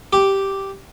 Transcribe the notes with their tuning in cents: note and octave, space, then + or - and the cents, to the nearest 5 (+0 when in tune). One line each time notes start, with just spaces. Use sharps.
G4 -5